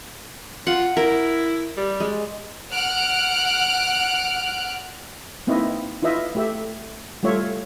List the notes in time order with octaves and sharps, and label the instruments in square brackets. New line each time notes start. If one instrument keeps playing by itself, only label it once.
[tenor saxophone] F4 [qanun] F#5
[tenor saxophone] E4 [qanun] A#4
[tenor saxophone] G3
[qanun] G#3
[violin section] F#5 F6 F#6 D7
[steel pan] A#3 C4 D#4 E4 B4 D#5
E4 F4 B4 D#5 E5
A3 G4 E5
G3 A3 F4 C#5 E5